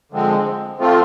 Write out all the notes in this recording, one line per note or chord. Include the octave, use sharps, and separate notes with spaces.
D3 F3 G#3 C4
F3 A3 C4 F4